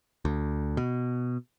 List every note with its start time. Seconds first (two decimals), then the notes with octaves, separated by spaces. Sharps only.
0.25 D2
0.77 B2